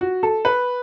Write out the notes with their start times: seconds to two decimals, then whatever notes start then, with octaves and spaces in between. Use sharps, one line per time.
0.01 F#4
0.23 A4
0.45 B4